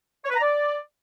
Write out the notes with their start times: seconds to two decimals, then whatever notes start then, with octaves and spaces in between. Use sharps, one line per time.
0.25 C#5
0.30 B4
0.36 A#5
0.42 D5